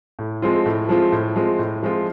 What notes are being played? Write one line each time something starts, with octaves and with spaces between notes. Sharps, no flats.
A2
F3 G#3 C4 F4
A2
F3 G#3 C4 F4
A2
F3 G#3 C4 F4
A2
F3 G#3 C4 F4